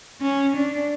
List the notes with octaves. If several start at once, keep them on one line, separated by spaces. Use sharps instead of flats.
C#4
D4